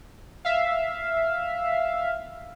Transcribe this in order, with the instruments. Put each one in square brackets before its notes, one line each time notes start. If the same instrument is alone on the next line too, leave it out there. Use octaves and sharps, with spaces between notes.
[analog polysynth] E5 F5